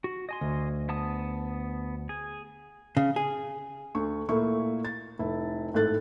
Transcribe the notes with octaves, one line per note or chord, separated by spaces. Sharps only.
F#4
D#5 G#5 C6
D2
B3 A5 D#6
G#4
C#3
G#4
D2 C#6
A#2 A3 A#3 E4 C#6
A6
F1 E4
G#1 A2 A3 F#6 A6